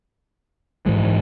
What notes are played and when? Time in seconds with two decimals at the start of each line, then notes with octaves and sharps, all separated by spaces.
0.86 G#2 E3 G#3